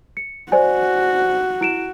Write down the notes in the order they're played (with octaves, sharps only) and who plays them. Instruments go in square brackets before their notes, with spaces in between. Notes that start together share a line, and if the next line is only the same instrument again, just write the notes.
[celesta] C#7
[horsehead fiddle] F#4 [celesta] C5 D5 G#5
[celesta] E4 D7 E7